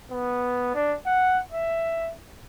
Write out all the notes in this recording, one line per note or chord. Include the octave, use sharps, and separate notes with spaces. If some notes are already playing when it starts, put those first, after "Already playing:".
B3
D4
F#5
E5